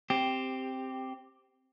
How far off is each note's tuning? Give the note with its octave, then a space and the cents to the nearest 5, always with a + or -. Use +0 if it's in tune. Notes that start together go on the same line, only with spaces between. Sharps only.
C4 +0 G4 +0